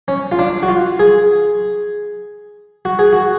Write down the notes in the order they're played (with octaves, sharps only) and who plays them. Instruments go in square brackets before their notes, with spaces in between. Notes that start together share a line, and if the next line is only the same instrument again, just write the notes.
[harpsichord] C#4
F4
D4
F#4
F4
G#4
F#4
G#4
F#4